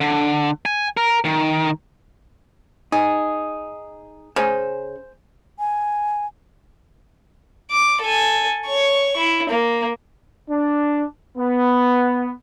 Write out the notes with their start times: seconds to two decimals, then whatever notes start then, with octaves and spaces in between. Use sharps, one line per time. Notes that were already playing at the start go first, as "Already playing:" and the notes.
0.01 D3
0.66 G#5
0.97 A#4
1.24 D#3
2.92 D#4 G#4
4.36 C#3 C5 G#5
5.59 G#5
7.71 D6
8.01 A4 G#5
8.66 C#5 C#6
9.17 E4
9.49 A#3
10.50 D4
11.38 B3